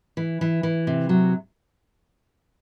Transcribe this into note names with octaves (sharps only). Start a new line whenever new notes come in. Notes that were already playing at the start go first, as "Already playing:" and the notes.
E3
E3
E3
C3
F#3